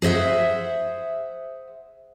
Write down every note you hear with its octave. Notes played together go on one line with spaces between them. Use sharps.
G#4 C5 D#5 E5 F#5